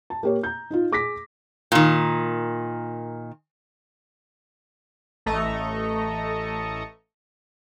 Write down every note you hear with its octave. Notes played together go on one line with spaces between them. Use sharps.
A5
A#3 G4 C#5
A#5 G6
D#4 F4
G#4 D6 A#6 B6
A#2 D#3
A1 A3 A4 D#5 A#5 C#6